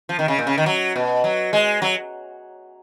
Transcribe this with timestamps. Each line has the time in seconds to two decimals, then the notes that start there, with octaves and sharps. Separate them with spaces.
0.09 F3
0.19 D#3
0.28 C#3
0.38 A#2
0.47 C#3
0.58 D#3
0.66 F#3
0.96 B2
1.24 F#3
1.53 G#3
1.82 F#3